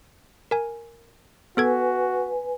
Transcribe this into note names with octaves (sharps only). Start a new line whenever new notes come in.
A#4 G#5
B3 F#4 A4 B4 G#5 G#6